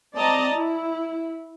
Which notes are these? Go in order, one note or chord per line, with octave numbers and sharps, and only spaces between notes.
C4 D5 D#5 A5 A#5
E4